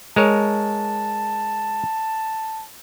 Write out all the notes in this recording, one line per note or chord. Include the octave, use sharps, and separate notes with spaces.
G#3 A#4 C#5 A5